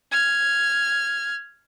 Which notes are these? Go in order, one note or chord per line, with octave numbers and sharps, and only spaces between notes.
F6 G#6